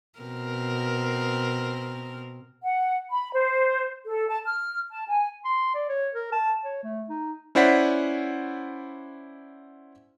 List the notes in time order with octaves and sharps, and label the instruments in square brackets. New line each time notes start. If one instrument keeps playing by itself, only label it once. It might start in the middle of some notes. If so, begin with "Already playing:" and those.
[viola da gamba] B2 C4 A#4
[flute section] F#5
B5
C5
A4
A5
F6
A5
G#5
[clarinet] C6
D5
C#5
A#4
A5
C#5
A3
D#4
[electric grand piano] C#4 E4 C5 D5 F#5 B6